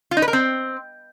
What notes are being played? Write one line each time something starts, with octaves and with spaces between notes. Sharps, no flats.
F4
D#4
B4
A#4
C4